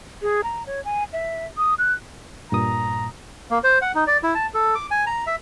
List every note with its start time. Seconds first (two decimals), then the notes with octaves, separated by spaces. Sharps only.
0.22 G#4
0.44 A#5
0.66 C#5
0.85 G#5
1.13 E5
1.58 D#6
1.79 F#6
2.52 G2 A#2 A#5 D#6
3.51 A#3
3.64 C5
3.82 F#5
3.95 D#4
4.07 D5
4.23 E4
4.35 A5
4.54 A4
4.75 D6
4.91 G#5
5.07 A#5
5.27 E5